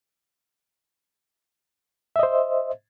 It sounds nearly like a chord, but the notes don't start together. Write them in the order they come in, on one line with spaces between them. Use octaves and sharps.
E5 D#5 C5